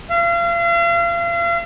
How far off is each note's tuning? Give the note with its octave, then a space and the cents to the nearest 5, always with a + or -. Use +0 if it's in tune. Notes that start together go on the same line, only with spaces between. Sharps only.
F5 -40